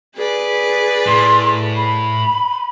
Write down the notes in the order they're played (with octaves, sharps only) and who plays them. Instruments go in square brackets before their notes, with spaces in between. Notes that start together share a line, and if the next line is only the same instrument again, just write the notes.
[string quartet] G#4 B4 D5
[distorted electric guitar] A2 [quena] C6
[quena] B5